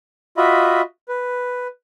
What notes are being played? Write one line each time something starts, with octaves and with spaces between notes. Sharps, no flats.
F4 F#4 D#5 E5 B5
B4